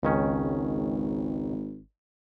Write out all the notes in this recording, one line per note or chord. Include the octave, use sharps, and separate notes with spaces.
G#1 C#2 D#3 C#4